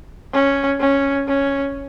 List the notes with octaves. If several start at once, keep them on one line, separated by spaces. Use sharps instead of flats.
C#4
C#4
C#4